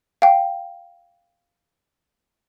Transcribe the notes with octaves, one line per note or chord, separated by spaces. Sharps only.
F5 G5